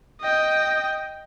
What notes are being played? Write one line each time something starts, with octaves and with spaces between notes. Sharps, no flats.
D#5 G5